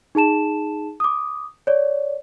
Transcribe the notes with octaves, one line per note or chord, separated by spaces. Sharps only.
D#4 G#4 A5 E7
D6 D#6
C#5 D5